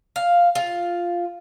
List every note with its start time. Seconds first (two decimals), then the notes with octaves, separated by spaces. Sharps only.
0.16 F5
0.55 F4